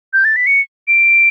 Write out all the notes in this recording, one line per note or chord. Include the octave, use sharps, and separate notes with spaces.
G6
A6
B6
C#7
D7